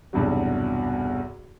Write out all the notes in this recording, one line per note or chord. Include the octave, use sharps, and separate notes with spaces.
B1 E2 G2 C3 F#3